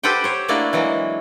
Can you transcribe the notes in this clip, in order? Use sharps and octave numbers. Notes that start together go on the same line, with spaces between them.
G4 A4 B4 C5 F#5 G5
C5 C#5
A3 A#3 D4 E4 F#4
E3 F#3 G#3 A#3